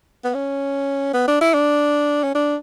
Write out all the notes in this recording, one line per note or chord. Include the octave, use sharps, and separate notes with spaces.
B3
C#4
B3
D4
E4
D4
C#4
D4